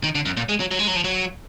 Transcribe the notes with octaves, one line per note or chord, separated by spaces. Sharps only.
D#3
D3
F#2
A#2
G#3
F#3
F#3
G#3
F#3
F3
F#3